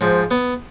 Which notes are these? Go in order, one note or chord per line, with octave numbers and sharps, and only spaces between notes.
G#2 F3
B3